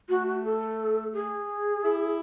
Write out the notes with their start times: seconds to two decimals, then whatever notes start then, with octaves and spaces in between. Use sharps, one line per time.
0.09 A3 F#4
0.27 F#4
0.44 A4
1.13 G#4
1.84 E4